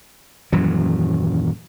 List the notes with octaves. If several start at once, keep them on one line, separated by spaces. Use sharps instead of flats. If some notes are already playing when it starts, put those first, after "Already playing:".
D#1 F#2 E3 F#3